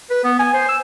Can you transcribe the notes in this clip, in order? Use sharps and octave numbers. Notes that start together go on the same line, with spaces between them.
B4
B3
G#5
C5
E6